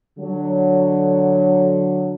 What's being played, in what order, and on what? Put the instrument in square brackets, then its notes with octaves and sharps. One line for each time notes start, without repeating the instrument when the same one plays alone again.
[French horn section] D3 F#3